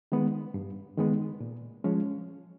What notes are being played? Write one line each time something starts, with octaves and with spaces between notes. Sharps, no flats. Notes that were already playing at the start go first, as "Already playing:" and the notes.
D#3 G#3 B3
G2
D#3 G#3 B3
A#2
F3 G#3 C#4